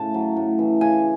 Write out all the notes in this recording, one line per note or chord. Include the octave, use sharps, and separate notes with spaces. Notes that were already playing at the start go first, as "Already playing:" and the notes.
Already playing: A2 C#3 A5
F#3
A2
E3
C#3 G#5